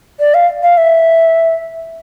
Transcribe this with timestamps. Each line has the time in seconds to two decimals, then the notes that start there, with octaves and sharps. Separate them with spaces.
0.20 D5
0.34 F5
0.63 F5
0.77 E5